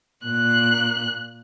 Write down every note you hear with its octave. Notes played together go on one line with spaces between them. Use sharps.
A#2 F#6